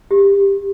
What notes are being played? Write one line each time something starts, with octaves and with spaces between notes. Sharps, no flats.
G4